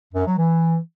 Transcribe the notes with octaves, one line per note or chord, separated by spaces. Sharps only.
F#2
F#3
E3